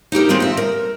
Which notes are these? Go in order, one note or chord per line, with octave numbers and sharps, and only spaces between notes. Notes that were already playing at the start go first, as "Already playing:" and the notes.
D#4 E4 G4 A#4
D#3 G#3 C4 E4 F4
D#5 E5
A#4